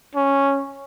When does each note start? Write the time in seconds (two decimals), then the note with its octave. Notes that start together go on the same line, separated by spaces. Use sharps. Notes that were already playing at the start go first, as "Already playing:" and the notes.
0.15 C#4